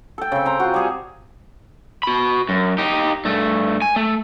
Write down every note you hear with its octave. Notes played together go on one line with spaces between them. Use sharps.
A4 G5
C#3 C4
C4 A#5
F4 F#4
G3 G#4 G#5
F#4 B5
F#2
D#4 G4
G2 A3
G#5
A3